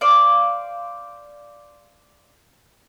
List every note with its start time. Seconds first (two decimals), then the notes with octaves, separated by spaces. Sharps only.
0.01 C5 D5 F5